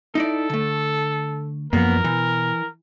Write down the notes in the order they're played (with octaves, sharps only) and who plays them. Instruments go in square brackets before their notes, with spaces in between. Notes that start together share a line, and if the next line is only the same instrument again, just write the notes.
[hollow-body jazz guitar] D#4 E4 D5 [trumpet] A4
[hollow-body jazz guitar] D3 A3
[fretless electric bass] F#2 F3 [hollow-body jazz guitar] A#3 B3 [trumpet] A#4
[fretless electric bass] B2 [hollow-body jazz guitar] E3